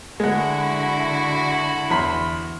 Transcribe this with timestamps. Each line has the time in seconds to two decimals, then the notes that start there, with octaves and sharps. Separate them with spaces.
0.20 D3 G#3 E4 F#4 F#5
1.90 E2 B5 C6